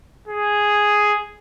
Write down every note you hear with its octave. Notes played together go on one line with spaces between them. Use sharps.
G#4